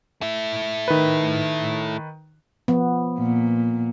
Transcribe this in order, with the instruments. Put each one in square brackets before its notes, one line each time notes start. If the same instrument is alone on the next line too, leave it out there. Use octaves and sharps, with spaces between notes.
[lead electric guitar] A3 E4
[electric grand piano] D#3 B4
[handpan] F3 B3
[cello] A#2